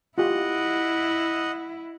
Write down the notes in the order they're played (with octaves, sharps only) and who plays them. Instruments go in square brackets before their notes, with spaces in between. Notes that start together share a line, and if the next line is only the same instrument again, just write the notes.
[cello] E4 [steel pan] F4 G4 [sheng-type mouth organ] D#5 F#5